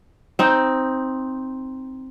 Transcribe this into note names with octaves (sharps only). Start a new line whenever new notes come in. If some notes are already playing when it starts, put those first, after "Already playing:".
C4 D#4